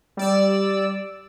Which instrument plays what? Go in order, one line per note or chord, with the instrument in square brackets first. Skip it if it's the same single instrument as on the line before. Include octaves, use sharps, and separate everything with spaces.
[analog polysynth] G3 D5 E6